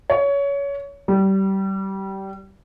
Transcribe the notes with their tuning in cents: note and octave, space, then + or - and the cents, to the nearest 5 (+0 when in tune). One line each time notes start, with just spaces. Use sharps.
C#5 +20
G3 -20